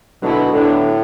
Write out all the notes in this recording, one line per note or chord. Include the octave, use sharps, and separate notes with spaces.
B2 D3 F#3 B3 E4
A2 D3 F#3 B3 D4